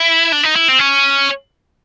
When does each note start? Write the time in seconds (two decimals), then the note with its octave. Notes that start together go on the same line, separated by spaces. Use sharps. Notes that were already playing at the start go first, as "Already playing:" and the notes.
Already playing: E4
0.32 D4
0.43 D#4
0.56 E4
0.68 C4
0.79 C#4